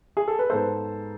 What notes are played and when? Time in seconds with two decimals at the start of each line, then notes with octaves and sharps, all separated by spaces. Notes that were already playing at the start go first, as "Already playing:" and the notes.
0.17 G#4
0.28 A4
0.39 B4
0.50 G#2 G#3 B3 A4 C5